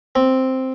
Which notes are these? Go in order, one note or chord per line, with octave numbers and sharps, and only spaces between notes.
C4